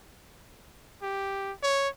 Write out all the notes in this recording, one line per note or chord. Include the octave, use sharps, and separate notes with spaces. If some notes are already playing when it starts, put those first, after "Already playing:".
G4
C#5